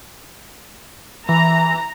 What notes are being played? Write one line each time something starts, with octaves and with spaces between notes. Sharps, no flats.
E3 A#5